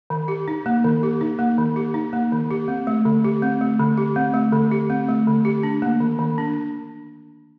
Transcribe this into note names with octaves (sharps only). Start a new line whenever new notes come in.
D#3
G4
D#4
A#3
D#3
G4
D#4
A#3
D#3
G4
D#4
A#3
D#3
G4
C4
A3
D3
G4
C4
A3
D3
G4
C4
A3
D3
G4
C4
A3
D3
G4
D4
A#3
D#3
D#3
D4